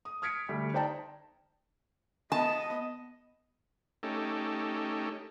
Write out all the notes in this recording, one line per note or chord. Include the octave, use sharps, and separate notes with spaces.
D#6
D#6 F6 G#6 B6 C#7 D7
D2 G3 A3
D#4 C5 D5 G5 A5 A#5
B3 D#5 A5
A3 C#4 D#4 G4 A4